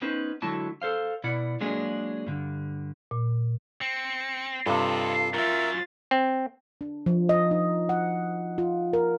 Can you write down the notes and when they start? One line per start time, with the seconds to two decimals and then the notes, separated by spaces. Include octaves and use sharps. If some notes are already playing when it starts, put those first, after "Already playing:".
0.01 B3 C#4 D#4 B4 C5
0.42 D3 F#3 G#3 E4 F#4 A5
0.82 A4 C5 F5
1.24 B2 E4 D5 F#5
1.60 F#3 G#3 A#3 D4 G#4
2.27 G2 D3
3.11 A#2
3.81 C4 C#7
4.66 G2 C3 F4 A4 C5 D#5
5.34 F#2 F#3 F4 A#4 E5 A6
6.11 C4
6.81 D4
7.06 F3
7.29 D#5
7.51 D#4
7.89 F#5
8.58 F4
8.93 A#4